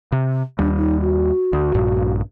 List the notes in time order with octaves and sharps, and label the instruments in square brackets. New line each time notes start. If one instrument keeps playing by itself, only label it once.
[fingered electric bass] C3
[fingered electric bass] D#2 G3 [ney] D4
[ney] D#4
F#4
[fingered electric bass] D2
A#1 G2 A#2